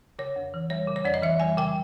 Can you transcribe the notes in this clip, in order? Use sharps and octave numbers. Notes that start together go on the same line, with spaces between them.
C#3 C#5
F2
E3
G3 C#5
C#3
C#5
F2 D5
D#5
E3 E5
G3 G#5
C#3 G5